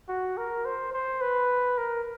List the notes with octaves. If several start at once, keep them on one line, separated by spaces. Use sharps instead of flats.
F#4
A#4
C5
C5
B4
A#4